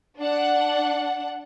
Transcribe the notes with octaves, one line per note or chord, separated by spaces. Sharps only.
D4 F#5